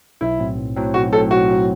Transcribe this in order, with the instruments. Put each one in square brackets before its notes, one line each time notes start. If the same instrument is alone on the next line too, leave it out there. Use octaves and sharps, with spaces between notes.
[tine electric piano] B1 [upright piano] E4
[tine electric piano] A2 F#3 C4
B1
A2 F#3 C4
[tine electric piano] B1 [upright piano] F#4
[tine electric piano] A2 F#3 C4 [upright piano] A4
[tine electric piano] B1 [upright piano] F#4
[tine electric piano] A2 F#3 C4